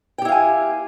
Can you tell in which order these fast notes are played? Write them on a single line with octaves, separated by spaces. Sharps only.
G5 G4 E4 F5 G#5